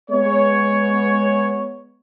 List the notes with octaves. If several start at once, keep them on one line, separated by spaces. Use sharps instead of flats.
G#3 B3 C#5